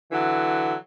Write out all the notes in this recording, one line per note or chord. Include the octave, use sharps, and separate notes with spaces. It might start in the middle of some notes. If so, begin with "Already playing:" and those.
D3 E3 F#3